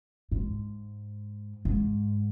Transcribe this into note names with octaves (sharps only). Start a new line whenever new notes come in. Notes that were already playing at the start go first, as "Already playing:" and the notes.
G#2
G#2